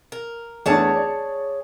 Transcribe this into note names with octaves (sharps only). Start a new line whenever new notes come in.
A#4
E2 A3 D4 G#4 C#5 A5
D5